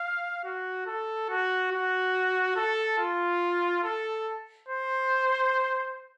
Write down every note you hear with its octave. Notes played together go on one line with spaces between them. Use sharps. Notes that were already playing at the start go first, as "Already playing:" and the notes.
Already playing: F5
F#4
A4
F#4
F#4
A4
F4
A4
C5